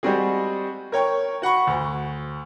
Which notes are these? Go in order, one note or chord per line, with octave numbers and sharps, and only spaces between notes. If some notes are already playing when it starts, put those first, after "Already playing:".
G3 G#3 C4 F#4 G#4
A#4 C#5 G5 C#6
F#4 F#5 B5 C#6
D2